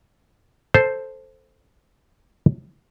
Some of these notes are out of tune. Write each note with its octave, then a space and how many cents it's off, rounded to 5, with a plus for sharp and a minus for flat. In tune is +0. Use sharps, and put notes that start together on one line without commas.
A4 +0 C5 +0